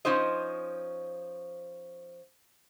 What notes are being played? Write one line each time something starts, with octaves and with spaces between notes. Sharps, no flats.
F3 C#4 D#4 C5 D#5